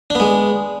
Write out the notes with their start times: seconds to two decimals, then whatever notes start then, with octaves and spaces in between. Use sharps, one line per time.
0.10 D4
0.15 B3
0.20 G#3